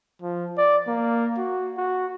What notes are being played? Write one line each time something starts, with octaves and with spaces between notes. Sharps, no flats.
F3
D5
A#3
F#4
F#4